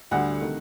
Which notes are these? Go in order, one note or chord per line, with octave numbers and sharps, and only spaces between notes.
D2 D3 G3 F#5
C3 D#3 A3